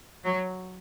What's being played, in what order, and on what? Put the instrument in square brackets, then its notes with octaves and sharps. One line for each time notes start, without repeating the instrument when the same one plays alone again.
[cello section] F#3